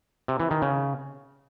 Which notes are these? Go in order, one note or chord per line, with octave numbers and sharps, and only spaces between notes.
C3
E3
D#3
C#3